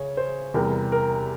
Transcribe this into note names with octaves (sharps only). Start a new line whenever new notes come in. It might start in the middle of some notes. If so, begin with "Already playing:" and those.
Already playing: C#3 C#5
C5
E2 C3 E3 G3 A#4
A#4